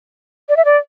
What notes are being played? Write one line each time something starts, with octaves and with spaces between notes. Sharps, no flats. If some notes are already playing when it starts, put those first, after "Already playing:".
D5
E5
D5